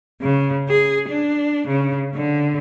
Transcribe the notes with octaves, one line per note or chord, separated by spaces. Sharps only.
C#3
G#4
D4
C#3
D3